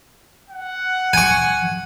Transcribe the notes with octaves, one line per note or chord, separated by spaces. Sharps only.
F#5
G#5 C#6